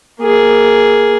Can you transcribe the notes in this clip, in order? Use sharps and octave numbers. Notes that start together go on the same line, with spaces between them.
A#3 G#4